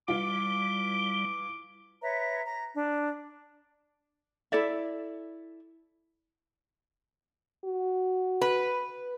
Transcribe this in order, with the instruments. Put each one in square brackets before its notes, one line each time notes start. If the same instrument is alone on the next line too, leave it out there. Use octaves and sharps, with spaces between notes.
[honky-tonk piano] E3 F4 [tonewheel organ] G3 [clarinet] D6
[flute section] B4 C#5 E5 A#5
A#5
D4
[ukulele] E4 A4 D5 E5
[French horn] F#4
[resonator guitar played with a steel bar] B4